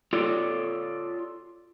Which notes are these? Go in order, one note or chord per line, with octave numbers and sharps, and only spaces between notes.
F4 A4 C#5 D5